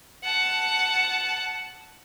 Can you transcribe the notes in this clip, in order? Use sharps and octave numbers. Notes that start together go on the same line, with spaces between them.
F#5 A5